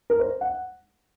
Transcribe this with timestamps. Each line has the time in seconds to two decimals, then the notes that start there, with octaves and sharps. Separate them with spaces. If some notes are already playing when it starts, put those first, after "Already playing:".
0.10 A#4
0.20 C5
0.41 F#5